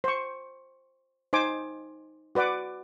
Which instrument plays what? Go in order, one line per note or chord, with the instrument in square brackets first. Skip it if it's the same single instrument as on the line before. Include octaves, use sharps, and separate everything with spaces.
[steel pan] C5 C#6
D#4 C5 G#5 D6
F#4 B4 D5 F#5 D6